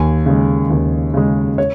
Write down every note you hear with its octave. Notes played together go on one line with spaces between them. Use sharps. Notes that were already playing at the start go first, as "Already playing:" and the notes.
Already playing: D#2 G#5
C#3 G#3
D#2
C#3 G#3
C#5